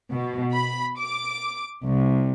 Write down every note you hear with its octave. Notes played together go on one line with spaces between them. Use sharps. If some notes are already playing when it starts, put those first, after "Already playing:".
B2
B5
D6
C2